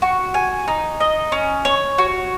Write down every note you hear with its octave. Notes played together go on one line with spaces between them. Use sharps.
F#4
G#5
D#4
D#5
C#4
C#5
F#4